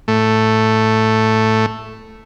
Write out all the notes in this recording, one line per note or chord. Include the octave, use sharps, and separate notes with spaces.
A2 A3